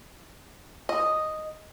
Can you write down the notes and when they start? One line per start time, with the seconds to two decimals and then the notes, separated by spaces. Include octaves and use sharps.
0.89 D#5